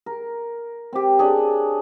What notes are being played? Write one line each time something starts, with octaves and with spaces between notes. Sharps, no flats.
A#4
C4 G4
D4 G#4 C#5